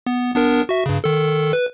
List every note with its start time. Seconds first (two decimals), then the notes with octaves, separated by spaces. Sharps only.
0.07 B3
0.35 B3 D4 A#4
0.69 F#4 E5
0.86 G2 C#3
1.04 D#3 A4
1.53 B4